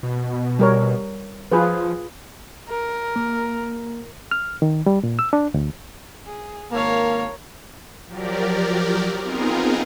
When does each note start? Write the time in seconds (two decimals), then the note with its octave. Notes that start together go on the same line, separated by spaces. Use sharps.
0.03 B2
0.59 G3 A#4 C#5
1.52 F3 F4 G#4 B4
2.69 A#4
3.16 A#3
4.31 F6
4.62 D#3
4.86 G3
5.03 A#2
5.19 E6
5.33 D4
5.54 D2
6.26 G#4
6.71 G#1 A#3 A#4 C#5 F5 A5
8.08 F3 F#3 G4 A#4 D5
9.22 B3 C4 D#4 F4 G#4 A#4